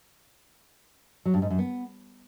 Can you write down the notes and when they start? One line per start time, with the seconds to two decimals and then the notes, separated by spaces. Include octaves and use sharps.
1.25 F#3
1.34 G2
1.42 G#2
1.50 F#2
1.59 B3